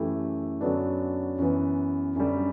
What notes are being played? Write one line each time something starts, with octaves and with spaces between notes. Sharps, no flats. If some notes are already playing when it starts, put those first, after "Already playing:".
Already playing: F#2 E3 A3 E4 G4
F#2 D3 F#3 B3 D4
F#2 E3 B3
F#2 D3 G3